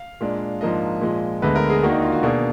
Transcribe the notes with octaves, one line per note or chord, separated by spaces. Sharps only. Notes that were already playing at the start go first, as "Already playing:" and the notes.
Already playing: F5
A#2 G#3 D4
G#2 F3 A#3 D4 D#5
A#2 F3 G#3
D2 D3 G#3 B3 B4
A#4
G#4
D#2 D#3 A#3 D4 F#4
D#4
F4
F#4
B2 A#3 D4 G#4